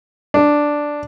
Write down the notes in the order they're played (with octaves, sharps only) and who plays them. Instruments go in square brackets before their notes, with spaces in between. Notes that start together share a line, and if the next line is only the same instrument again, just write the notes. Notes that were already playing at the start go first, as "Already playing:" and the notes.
[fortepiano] D4